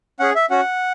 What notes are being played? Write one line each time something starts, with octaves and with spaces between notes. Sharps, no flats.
C#4 G#4 F#5
E5
C#4 F#4 F#5